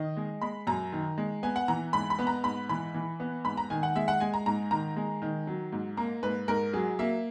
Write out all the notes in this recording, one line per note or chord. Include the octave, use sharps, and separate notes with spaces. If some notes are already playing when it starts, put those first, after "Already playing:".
Already playing: D#3 D#5
G#3
G#3 B5
F#2 A#5
D#3
G#3
B3 G#5
F#5
E3 A#5
G#2 B5
B5
B3
A#5
G#2 B5
E3 B5
E3
B3
G#2 B5
A#5
D#3 G#5
F#5
G#3 E5
F#5
G#3 G#5
A#5
G#2 A#5
D#3 A#5
G#3
D#3
F#3
G#2
A#3 A#5
G#2 B4
G#2 A#4
F#3 G#4
A#3 E5